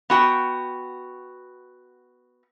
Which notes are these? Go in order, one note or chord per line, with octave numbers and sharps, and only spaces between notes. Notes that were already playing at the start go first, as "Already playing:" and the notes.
B3 F#4 G5